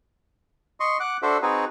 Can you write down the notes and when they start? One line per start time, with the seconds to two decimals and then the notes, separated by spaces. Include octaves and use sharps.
0.80 D#5 C6 C#6
1.00 F#5 D6 F#6
1.22 D4 F#4 A4 C5 E5
1.42 C4 D#4 F#4 G#4 B4